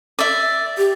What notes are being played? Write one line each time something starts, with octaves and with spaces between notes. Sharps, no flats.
D5 E5
G4